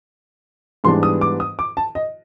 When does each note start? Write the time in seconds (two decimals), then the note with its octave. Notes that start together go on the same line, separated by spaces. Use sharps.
0.84 G#2 E3 G3 B3 D4 C6
1.03 D#6
1.21 D6
1.40 D#6
1.59 D6
1.77 A5
1.95 D#5